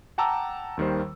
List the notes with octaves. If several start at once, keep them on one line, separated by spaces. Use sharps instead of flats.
F#5 G5 A5 A#5 D6 E6
D#2 D#3 G3 C5